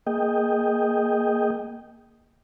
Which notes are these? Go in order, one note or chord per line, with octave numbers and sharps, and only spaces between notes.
A#3 G#4 D#5 G5